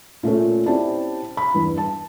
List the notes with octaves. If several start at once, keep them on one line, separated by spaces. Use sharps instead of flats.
A#2 A3 C#4 A4
C4 C#4 E4 G4 D5 A5
B5
E2 G2
A5